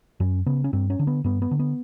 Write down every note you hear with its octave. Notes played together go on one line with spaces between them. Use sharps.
F#2 C#4
C#3 B3
C#4
G2 C4
C#4
D3
B3
G2 B3
B3
D3
B3